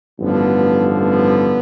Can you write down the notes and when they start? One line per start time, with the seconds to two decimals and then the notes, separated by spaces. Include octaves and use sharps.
0.20 A1 G2 D3 F3 B3
1.00 B3